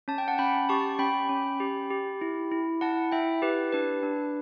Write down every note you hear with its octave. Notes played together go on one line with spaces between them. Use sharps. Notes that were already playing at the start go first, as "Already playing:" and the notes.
C#4 A5
G5
F#5 A5
C#4 G5 B5
G4 A5 C#6
C#4 G5 B5
C#4
G4
G4
E4
E4
E4 F#5 A5
E4 E5 G5
G4 B4
D4 B4
D4